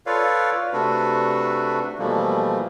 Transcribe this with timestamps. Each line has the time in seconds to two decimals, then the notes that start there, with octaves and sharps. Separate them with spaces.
0.06 F4 A4 B4 C#5 D5 F5
0.73 C3 A3 D4 F#4 A4 B4
1.99 B2 E3 F3 G3 A3 A#3